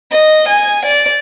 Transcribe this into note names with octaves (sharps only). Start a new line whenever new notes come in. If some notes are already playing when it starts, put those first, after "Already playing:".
D#5
G#5
D5